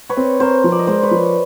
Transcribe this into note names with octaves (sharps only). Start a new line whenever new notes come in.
B4 C#5
C4
C4 A#4 C5
F3
D5
D#5
G#3 C5 D5
B4 C#5
F3